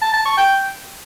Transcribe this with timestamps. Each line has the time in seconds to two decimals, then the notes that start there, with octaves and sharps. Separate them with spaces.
0.01 A5
0.13 A5
0.25 C#6
0.37 G5